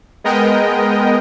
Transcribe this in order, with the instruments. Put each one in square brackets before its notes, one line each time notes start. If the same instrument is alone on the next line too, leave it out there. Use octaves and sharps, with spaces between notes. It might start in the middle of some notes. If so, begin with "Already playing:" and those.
[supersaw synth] G#3 B3 A#4 D#5 G5